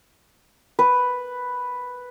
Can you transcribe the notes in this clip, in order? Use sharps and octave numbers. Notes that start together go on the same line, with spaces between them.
B4